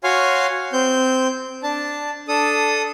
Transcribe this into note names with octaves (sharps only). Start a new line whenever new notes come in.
F#4 C#5 F5 G#5 C6
C4 G6
D4 A5
D4 A4 D#6